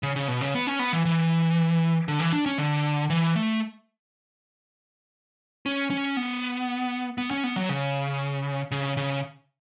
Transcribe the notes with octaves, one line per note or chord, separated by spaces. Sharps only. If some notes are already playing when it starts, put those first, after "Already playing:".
C#3
C#3
B2
C#3
B3
C#4
B3
E3
E3
D3
E3
D4
C#4
D3
E3
A3
C#4
C#4
B3
B3
C#4
B3
F#3
C#3
C#3
C#3